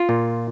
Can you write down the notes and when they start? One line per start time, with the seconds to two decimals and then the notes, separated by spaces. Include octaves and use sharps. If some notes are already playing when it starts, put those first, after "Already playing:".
Already playing: F4
0.09 A#2